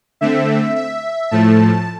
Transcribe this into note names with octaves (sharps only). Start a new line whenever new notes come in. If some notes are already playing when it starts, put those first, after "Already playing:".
D3 A3 C4 E5
E5
A2 F3 A3 A5